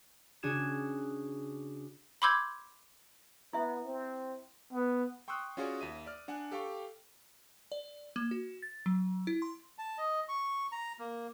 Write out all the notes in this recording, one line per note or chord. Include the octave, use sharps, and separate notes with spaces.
C#3 D4 F#4 D#6 G#6 E7
B5 C6 D6 E6 G6 G#6
B3 E4 E5
C4
B3
G5 C6 C#6 D#6 E6 F#6
C#4 F4 F#4 G#4 C#5 D5
D#2 E5 D#7
D5 F6
D4 F#5 G#5
G4 A4 F5 G5 C#6
D5
A#3
F#4
A6
F#3
E4
C6
A5
D#5
C#6
A#5
A#3